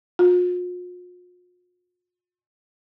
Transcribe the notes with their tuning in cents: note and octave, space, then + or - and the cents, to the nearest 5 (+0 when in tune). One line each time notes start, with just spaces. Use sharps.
F4 +45